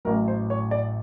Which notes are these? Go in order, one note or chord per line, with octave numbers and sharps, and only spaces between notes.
A1 A2 F#3 A#4
C5
C#5
D5